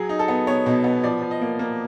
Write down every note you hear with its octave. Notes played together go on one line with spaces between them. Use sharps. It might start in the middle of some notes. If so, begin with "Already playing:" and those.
Already playing: F#3 G#4
D#4
A4
B3
B3 C#5
B2
B3
F3 D5
F3
D#5
A#3
A#3